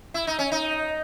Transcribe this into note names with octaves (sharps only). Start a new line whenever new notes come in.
E4
D#4
C#4
D#4